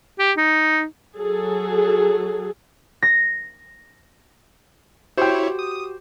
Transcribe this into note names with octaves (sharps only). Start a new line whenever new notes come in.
G4
D#4
F#3 G#4 A4
A#6
E4 F#4 G4 C5 C#5 G5
D#6